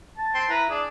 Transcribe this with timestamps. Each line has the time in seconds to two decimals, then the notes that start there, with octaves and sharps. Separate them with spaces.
0.18 A5
0.35 C4 C6
0.50 E4 B4 A#5
0.70 D4 G#4